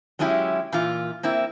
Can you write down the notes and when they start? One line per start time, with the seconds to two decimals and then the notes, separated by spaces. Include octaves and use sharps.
0.19 F#3 G#3 C#4 D4 E4 G4
0.72 A#2 E3 F4
1.23 A#3 C4 E4